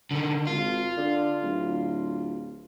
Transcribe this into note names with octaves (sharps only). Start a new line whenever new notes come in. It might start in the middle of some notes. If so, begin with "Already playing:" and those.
D3 D#3
G#1 F4
D3
D1